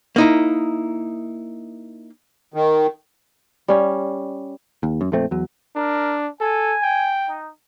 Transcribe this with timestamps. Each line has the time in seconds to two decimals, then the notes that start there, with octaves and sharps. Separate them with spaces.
0.16 A#3 D#4 E4
2.54 D#3
3.68 G3 C#4
4.83 D#2
5.01 F#2
5.12 A#1 F2 A3 C4
5.31 E2 F#3
5.76 D4 A#4
6.41 A4 G#5
6.83 G5
7.28 D#4